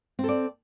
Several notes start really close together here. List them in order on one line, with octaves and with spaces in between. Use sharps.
C4 A4 D5